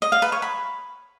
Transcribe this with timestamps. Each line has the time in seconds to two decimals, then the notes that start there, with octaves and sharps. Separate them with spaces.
0.02 D#5
0.12 F5
0.22 B4
0.32 C#5
0.42 B5